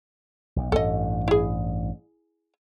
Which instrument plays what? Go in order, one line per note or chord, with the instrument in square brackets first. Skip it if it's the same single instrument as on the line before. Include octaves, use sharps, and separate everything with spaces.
[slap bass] B1
[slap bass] A1 G2 [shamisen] A4 D#5
[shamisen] E4 G#4